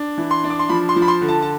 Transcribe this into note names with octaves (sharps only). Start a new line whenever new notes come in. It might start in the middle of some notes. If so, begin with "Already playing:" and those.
Already playing: D4
E3
C6
D4
D6
C6
F3 B5
C6
F3
B5
C6
D3
A5
A5